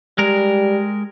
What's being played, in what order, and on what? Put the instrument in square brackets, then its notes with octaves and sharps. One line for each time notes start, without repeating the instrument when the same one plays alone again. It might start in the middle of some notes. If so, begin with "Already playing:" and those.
[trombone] G3 [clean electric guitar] G#3 A#4